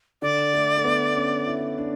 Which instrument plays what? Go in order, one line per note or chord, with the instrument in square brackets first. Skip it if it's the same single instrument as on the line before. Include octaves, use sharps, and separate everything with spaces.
[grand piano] D3 [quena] D5
[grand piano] A3
A3
B3
C#4
E4
D4